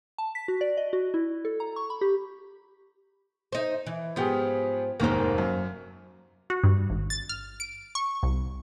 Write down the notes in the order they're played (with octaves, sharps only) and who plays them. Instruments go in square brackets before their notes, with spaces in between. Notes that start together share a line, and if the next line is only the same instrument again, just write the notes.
[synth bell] A5
B6
F#4
D5
D#5
F#4
E4
A4
A#5
C#6
B5
G4
[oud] D#4 C5
E3
[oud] G#2 F3 [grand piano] B3 G4 G#4
[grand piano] F1 D#2 G#2 [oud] A#3 C5
[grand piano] F#2
[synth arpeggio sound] F#4
G2
G#1
A6
F6
D7
C#6
C2